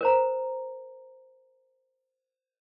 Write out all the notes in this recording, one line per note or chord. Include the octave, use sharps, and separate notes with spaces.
A#4 C5 A#5